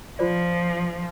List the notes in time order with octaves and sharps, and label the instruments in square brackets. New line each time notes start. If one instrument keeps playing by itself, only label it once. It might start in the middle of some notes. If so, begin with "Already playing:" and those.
[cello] F3 [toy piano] F4 C5 D5